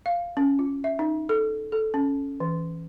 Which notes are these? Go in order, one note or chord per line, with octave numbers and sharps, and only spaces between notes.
F5
C#4
F4
E5
D#4
A4
A4
C#4
E3